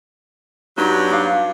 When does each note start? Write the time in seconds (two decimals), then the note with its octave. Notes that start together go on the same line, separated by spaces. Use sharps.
0.78 G2 F#3 D#4
1.10 D4 F5